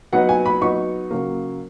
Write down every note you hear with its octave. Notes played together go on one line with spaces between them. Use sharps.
F#3 B3 D#4 F#5
G#5
B5
F#3 B3 D#4 C#6
C#3 F#3 A#3